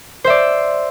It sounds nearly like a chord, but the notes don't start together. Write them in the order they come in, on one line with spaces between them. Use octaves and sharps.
C5 E5 D5